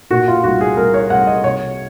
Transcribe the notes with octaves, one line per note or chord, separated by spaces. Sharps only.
A#2 F#4
F4
C2 F#4
G#4
C2 A#4
C#5
C2 F#5
D#5
C3 C#5